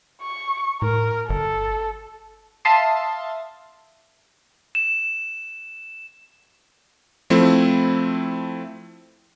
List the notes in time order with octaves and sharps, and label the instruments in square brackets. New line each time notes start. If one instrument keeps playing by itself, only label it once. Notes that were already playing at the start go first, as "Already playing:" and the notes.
[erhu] C#6
[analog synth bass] A2 [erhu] A#4
[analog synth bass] G1 [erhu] A4
[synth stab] E5 F5 A5 C6 D#6
[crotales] E7
[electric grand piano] F3 A3 C4 E4